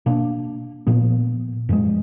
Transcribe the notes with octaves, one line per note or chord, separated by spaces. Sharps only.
B2 A#3 D4
A#2 F3 B3
F#2 F3 G#3